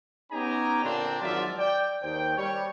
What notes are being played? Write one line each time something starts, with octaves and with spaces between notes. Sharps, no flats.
B3 C#4 D#4 G4 G#5 A#5
A#2 D3 A#3 C4 D4
G#1 F3 F#3 F4 D5 E5
D5 G5
D#2 D#3 C5 G5
G3 C#5